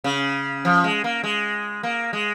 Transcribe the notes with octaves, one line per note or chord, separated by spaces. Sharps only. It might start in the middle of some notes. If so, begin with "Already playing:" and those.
C#3
F3
G#3
A#3
G#3
A#3
G#3